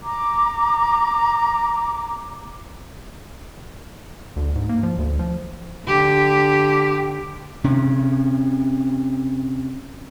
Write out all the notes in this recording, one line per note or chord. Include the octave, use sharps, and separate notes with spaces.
A#5 D6
D2
G#2
A#3
F3
D2
F3
D3 G4
C3 C#4